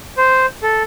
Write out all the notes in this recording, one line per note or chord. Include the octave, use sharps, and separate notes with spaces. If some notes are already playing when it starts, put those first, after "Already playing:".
C5
A4